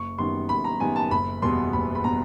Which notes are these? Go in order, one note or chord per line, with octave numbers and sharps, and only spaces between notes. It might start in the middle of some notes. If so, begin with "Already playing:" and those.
Already playing: F#1 C#6
F#2 D#3 G3 B3 C6
F#1 B5
A#5
F#2 D#3 G3 B3 G#5
A5
F#1 B5
E2 B2 G3 B3 C6
F#1 B5
B5
B2 G3 B3 A#5